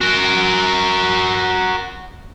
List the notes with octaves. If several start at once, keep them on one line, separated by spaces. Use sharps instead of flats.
F#4 A#4